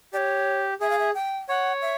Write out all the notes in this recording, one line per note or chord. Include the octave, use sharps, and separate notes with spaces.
G4 C#5 D5
G#4 E5
F5
E5
G5
C#5 F#5
E5